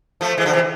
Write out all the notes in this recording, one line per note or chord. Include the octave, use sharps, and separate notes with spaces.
F3 A3
E3 G#3
D3 F3
C3 E3